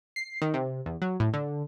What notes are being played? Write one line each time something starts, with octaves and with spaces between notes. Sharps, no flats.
C7
D#3
C3
E2
F#3
A2
D3